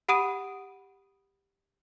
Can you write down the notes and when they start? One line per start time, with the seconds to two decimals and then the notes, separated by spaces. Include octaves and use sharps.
0.09 G4 F#5 B5 D#6 D7 D#7